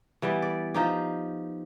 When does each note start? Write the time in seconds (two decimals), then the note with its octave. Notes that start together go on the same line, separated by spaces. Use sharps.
0.22 E3 G3 B3
0.42 D5
0.74 F3 D#4 G4